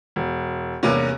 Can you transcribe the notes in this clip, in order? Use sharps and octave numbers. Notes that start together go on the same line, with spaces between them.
E1
E2 G2 C3 A#3 C#4